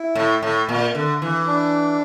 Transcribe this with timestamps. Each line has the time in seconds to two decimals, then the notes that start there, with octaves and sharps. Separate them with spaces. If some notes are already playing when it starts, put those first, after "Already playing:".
Already playing: E4
0.15 A2
0.43 A2
0.69 A#2
0.95 D3
1.22 E3
1.47 D4